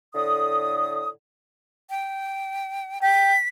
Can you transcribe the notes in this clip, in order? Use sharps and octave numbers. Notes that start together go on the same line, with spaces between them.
A2 D3 D#6
G5
G5 B6